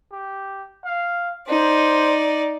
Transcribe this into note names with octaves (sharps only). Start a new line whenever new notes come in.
G4
F5
D#4 C5 D5